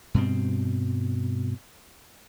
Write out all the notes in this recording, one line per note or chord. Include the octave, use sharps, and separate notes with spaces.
G2 B2 C4